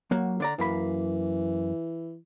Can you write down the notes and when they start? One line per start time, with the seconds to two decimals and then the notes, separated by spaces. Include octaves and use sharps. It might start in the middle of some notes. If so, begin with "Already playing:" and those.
0.11 F#3 A#3 F#4
0.40 D3 D5 A#5
0.59 F#2 E3 A#3 B5